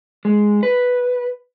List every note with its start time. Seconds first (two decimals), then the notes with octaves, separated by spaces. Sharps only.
0.25 G#3
0.63 B4